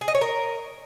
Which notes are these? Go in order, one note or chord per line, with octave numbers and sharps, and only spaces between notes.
G#4
D#5
C#5
A#4